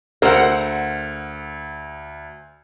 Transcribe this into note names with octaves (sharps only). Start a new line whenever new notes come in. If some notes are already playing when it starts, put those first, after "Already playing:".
D2 A#4 C5 F#5 E6